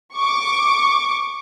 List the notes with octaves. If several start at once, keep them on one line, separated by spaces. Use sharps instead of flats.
C#6 D6